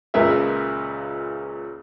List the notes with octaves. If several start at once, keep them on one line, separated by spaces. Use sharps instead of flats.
C#2 A#2 C#3 A#4 B4 E5